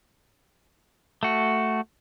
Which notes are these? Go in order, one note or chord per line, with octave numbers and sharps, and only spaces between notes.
A3 F#4